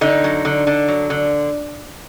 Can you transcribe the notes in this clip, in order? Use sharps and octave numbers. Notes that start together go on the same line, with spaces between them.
D3 D#4
F#3
D3
D3
F#3
D3